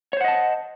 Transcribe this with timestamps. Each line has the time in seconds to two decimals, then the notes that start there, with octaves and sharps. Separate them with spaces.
0.13 C#5
0.17 C5
0.21 F#5
0.24 D#5
0.28 A5